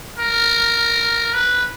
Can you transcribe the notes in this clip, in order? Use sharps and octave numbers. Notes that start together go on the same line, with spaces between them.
A#4
B4